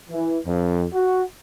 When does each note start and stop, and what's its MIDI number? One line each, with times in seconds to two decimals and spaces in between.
0.10 0.38 52
0.46 0.83 41
0.93 1.22 66